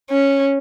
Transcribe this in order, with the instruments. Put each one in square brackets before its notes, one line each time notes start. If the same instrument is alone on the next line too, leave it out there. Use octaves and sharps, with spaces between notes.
[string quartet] C#4